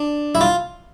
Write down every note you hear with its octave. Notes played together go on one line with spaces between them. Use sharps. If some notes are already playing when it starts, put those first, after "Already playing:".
Already playing: D4
E4
F4